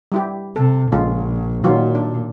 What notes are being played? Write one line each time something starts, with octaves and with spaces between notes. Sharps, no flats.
G3 E4 G4
C3 A4
A#1 C#3 G#3 F4
A#2 D#3 F#3 F4
D4